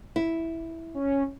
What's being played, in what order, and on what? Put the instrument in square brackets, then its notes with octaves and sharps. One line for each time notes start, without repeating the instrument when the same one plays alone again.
[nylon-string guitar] E4
[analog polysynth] C#4